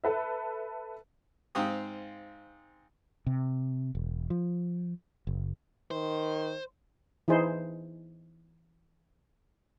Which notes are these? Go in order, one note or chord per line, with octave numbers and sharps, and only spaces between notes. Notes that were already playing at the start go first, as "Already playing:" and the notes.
A4 B4 E5
G#2 C4 F5 G5 D#6
C3
E1
F3
F#1
D#3 C5
E3 D#4 E4 G#4 C5